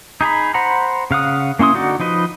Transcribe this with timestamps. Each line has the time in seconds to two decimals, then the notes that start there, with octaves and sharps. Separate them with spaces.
0.21 D#4 G#4 A#5 B5
0.54 C5 F#5 A#5 B5
1.11 C#3 F5 F#5 D#6
1.59 A#3 C#4 E4 C6 D#6
1.74 D3 D#4 F#4 D5 F#5
2.00 F3 D#4 B4 D#5